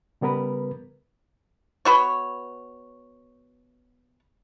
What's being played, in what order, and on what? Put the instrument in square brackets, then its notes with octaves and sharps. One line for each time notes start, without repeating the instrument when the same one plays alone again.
[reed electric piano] C#3 G3 B3 A#4 B4
[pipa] B3 F#4 C#5